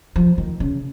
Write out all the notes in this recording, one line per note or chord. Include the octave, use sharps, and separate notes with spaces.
F3
D#3
C#3